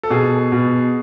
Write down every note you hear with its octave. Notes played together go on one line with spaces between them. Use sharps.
A4
B2 G#4
B2